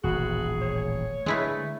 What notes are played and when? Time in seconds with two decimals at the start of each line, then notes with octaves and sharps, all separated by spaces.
0.04 D#1 A1 F#4 G#4
0.62 C#5
1.26 D3 G#3 A3 E4 B4